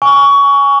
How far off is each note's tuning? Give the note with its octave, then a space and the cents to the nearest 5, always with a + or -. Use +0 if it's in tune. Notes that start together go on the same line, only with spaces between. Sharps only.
G#5 -10 C#6 +20